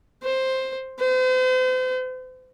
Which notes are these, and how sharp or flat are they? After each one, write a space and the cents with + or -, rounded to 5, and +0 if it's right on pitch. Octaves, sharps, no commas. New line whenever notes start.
C5 +5
C5 -40